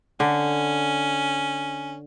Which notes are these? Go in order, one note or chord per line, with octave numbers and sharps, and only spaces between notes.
D3 C#4